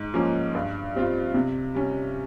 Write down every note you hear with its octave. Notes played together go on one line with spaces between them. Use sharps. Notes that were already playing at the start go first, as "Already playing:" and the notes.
Already playing: G#2
F3 A#3 C#4
G2
G3 C4 F4
C3
G3 C#4